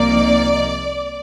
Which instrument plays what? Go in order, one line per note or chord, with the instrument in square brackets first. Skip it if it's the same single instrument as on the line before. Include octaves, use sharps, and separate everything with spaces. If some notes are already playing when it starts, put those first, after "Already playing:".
Already playing: [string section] C2 C3 F3 A#3 D#4 D5